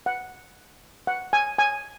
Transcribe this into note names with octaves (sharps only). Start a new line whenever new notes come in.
F#5
F#5
G#5
G#5